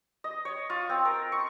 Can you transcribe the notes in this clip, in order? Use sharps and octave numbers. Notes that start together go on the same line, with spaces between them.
D#5
C#5
F4
C4
A#4
C#6